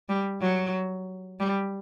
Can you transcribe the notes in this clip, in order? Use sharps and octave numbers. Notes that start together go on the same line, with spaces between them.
G3
F#3
G3